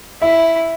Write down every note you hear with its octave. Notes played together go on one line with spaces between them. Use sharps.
E4 E5